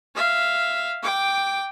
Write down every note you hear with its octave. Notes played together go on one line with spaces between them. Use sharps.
E5 F5
G5 D6